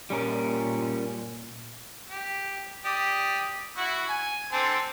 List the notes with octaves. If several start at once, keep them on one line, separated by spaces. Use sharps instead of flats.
A#2 G3 C#4 A#4
G4
G4 D5 D#6
E4 F#4
G#5
D3 C4 A5